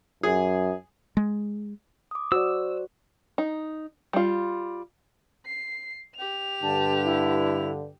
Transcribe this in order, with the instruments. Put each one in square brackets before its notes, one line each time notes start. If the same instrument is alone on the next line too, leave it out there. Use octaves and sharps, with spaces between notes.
[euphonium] F#2 [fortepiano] G#4
[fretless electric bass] G#3
[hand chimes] D6 D#6
[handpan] F#4 [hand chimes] C5 D5 [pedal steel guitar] E6
[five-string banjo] D#4
G3 F4
[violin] C7
G4 F7
[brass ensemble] G2 D3 [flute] A5
[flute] E4